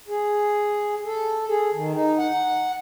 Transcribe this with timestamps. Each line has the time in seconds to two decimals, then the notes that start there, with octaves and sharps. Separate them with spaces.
0.08 G#4
1.05 A4
1.49 G#4
1.73 D#3
1.94 D#4
2.18 F#5